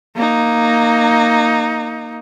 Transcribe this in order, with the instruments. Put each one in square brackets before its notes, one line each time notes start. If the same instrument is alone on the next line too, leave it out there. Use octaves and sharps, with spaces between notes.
[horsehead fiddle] A#3 D#4